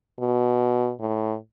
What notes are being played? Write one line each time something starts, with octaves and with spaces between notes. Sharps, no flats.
B2
A2